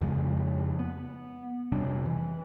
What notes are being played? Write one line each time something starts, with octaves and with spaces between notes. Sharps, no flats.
F2 C#3 F3 G#3
B3
F1 C3 G3 D4
E3